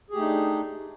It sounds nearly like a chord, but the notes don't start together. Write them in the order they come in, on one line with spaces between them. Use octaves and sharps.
G#4 G4 A3 D#4 D4